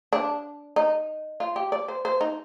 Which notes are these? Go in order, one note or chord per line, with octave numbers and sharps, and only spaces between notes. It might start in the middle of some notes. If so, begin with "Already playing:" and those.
D4
D#4
F4
G4
D5
C5
C5
D#4